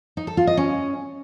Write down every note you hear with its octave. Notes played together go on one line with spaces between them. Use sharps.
D#4
A4
F4
D#5
C#4